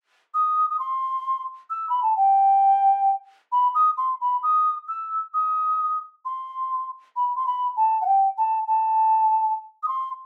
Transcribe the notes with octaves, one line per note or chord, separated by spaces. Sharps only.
D#6
D#6
C6
E6
B5
A5
G5
B5
D#6
C6
B5
D#6
E6
D#6
C6
B5
C6
B5
A5
F#5
G5
A5
A5
D#6
C6